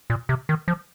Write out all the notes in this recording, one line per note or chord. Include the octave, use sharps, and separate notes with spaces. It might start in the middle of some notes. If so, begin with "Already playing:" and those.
A#2
C3
D#3
F3